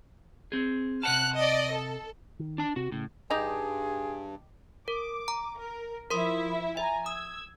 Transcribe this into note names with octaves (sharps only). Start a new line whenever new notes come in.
C4 G#4
C3 F#5 A5 F6 F#6
D5 D#5
A4
D#3
D4 A5
C3 F#4
A2 C#3
G2 D#4 G4 G#4
A#4 D6
A#5
A#4
F3 E4 A#4 E5 C6 D#6
E5 G#5 A#5
D#6 E6 G#6